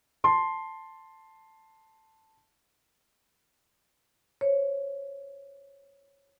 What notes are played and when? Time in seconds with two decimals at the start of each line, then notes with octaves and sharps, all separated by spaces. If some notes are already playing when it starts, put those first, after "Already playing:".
0.24 A5 C6
4.41 C5 C#5